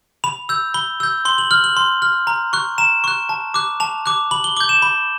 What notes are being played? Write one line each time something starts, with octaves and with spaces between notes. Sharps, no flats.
B5 F7
E6 G6
B5 G7
E6 G6
C6 G7
F#7
F6 F#7
F#7
C6
F6
A#5
C#6 F#6
A#5 E7
C#6 F#6
A5
D6 F#6
A5 F7
D6 F#6
B5 F#7
G7
D6 G6 G7
E7
B5